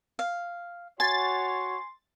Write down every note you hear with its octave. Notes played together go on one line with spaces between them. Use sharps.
F5
F#4 C#5 G#5 C6 A6